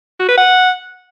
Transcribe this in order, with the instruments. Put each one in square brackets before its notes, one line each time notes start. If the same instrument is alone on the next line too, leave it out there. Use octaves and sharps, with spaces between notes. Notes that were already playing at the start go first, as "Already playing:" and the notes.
[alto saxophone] F#4
B4
F#5